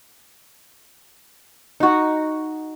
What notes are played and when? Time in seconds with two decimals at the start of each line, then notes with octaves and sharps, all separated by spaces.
1.80 D#4 F#4